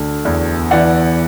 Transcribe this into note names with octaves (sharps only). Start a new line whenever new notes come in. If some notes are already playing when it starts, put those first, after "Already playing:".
Already playing: D2 D3
E2
E3 D5 F#5